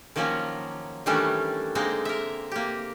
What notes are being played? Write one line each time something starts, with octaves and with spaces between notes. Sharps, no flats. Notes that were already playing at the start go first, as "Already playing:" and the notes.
D#3 F3 F#3 A#3 C#4
D#3 E3 G3 A3 C#4 D4
D3 G#3 A#3 C4 D#4
A#4 E5
A#3 G4